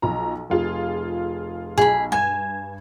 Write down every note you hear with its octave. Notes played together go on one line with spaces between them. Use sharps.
B1 F3 A#5
F1 F4 G#4
B1 G#4 B5
G2 G#5 G#6 E7